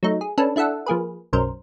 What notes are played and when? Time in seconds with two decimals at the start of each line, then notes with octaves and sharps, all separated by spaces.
0.03 F#3 A3 D#4
0.21 G#4
0.38 C#4 D4 A4 B4
0.56 D4 E4 A4 E5 F#5
0.86 F3 A#3 G#4 B4
1.33 B1 F#2 A#4 C5